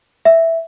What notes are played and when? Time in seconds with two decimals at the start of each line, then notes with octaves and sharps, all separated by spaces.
0.25 E5